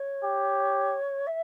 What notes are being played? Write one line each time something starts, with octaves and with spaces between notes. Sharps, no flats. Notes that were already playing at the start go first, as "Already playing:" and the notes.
Already playing: C#5
G4
E5